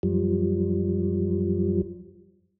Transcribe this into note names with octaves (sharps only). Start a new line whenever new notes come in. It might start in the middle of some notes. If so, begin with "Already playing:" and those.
F#2 F3 G3